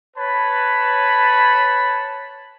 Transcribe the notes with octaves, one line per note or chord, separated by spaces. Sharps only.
B4 C#5 A5 B5